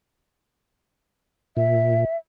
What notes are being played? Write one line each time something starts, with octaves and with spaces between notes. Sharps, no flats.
A#2 E5